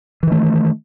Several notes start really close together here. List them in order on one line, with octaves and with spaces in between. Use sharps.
E3 D#3 A3